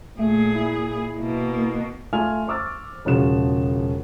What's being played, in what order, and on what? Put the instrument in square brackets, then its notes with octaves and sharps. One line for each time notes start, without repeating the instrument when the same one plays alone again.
[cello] A#2 G#4 [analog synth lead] A3
[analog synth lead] E4
[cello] B2 A#3
[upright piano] A3 F4 G#5 F6 F7
C5 C#6 D6 E6 F6 A6
E1 C#3 F3 F#4 F#6 E7